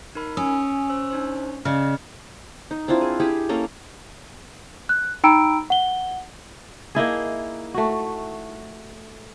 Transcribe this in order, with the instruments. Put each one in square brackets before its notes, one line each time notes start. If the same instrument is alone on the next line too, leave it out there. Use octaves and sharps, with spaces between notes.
[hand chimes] D#4 A#4 B5
[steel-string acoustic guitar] C#4 [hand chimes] G#5 D#6 E6
[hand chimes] C5 E6
D4 D#4 C5
[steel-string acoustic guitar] C#3 [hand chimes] D5 D#5 F6
[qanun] D#4
C4 D4 E4 F4
G#4
E4 G4 G#4 B5
A#3 C#4 A4 A#5
[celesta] F#6
D#4 G5 A#5 B5 E6 D7
F#5 G7
[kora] A#3 D#4 E4 G#4
A3 F#4